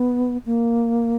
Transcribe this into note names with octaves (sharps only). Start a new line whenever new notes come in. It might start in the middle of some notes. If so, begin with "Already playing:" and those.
Already playing: B3
A#3